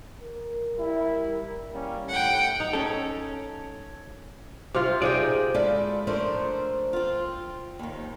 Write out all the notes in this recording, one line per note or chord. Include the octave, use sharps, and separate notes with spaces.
A#4
G3 E4
G3 A#3 C#4
A2 D#3 G3 A3 F#5 G5
D#4
C#4 A4
C3 F4
C3 D#4 G#4 D5 G5
G#3 E4 F4 A4 D5 E5
F3 A3 D4 A#4 C5
C4 F4
D#2 D#3